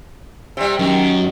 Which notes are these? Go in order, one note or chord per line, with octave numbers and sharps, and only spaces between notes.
C3 G3
F#2 D#3